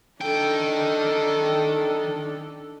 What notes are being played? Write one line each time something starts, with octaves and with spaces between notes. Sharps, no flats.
D#3 D4 A4 G5